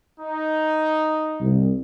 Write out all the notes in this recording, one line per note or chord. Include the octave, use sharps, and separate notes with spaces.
D#4
C2